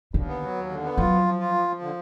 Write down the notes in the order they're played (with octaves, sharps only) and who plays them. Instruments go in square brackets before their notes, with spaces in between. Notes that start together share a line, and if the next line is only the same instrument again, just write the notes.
[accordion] D#2 [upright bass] D3
[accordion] B3
F#3
D#2
D3
B3
[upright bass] F#3 [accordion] F4
[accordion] F3
F3
F4
F3
F3
D3